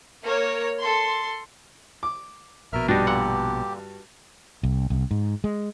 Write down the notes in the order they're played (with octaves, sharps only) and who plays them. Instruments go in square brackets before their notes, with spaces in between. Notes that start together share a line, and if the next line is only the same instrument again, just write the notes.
[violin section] A#3 A#4 C#5
A4 C6
[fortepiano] D6
[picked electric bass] A#1 B2 [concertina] A#4 E5 F6
[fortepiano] G2 G3 F#4 [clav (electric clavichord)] D4 D#4 [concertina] G4
[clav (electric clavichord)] A#2 D3 F#5
[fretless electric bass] C2
C2
G#2
G#3